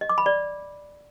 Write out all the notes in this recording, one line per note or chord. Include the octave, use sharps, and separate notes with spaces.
D#5
D6
B5
D5